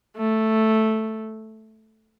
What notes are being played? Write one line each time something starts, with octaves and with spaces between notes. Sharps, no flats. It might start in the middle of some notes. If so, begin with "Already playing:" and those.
A3